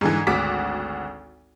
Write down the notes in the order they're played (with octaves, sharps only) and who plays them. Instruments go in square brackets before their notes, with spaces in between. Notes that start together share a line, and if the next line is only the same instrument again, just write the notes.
[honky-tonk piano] G#2 D3 E3
G#1 D2 F#4 D6 B6